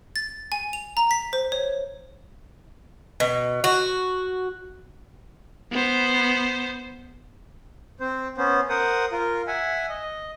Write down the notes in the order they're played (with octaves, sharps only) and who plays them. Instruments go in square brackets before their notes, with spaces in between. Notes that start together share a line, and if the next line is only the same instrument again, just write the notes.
[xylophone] A6
G#5
F7
A#5
B6
C5
C#5
[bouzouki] B2
F#4
[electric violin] B3 C5
[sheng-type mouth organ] C4 C5
B3 C#4 C5
A#4 C5 F#5 D#6
F4 A#4
E5 F#5 G#5
D#5